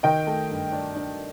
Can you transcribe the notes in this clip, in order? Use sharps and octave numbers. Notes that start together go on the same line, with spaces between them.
D#3 D#5 G5
A3
G2
D4
D4